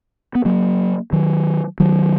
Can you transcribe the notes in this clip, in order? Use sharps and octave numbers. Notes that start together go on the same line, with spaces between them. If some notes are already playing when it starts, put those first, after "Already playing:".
B3
F#3 A#3
D#3 F#3
D#3 F#3